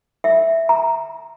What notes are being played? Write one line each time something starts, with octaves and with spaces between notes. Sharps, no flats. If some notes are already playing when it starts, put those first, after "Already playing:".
E5
A#5